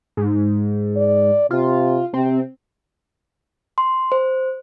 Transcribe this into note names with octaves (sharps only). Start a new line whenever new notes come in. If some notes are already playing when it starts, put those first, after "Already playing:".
G#2
D5
C3 F4
C3 C4
C6
C5